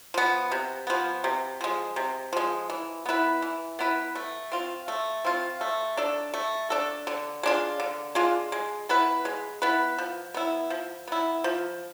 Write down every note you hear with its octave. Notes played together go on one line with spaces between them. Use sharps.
F3 B3
C3
F3 B3
C3
F3 G#3
C3
F3 G#3
E3
B3 E4 B4
E3
B3 E4 B4
A3
C4 F4
A3
C4 F4
A3
D4 A4
A3
D4 A4
D3
G#3 D4 F4
D3
G#3 D4 F4
G#3
B3 E4 B4
G#3
B3 E4 B4
F3
B3 E4
F3
B3 E4
F3